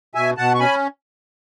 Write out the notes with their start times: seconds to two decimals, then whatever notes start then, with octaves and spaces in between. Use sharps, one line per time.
0.15 B2 E5 G#5
0.37 B2 F#5 A5
0.55 C#6
0.59 C#4 G#5 B5